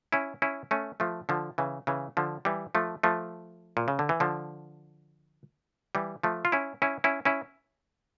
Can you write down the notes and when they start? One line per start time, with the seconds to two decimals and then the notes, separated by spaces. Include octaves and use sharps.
0.13 C#4 E4
0.42 C#4 E4
0.71 A3 C#4
1.00 F3 A3
1.29 D3 F3
1.58 C#3 E3
1.87 C#3 E3
2.17 D3 F3
2.45 E3 G3
2.75 F3 A3
3.03 F3 A3
3.77 A#2
3.88 C#3
3.99 D3
4.09 E3
4.20 D3 F3
5.95 E3 G3
6.23 F3 A3
6.45 F4
6.52 C#4 E4
6.82 C#4 E4
7.04 C#4 E4
7.25 C#4 E4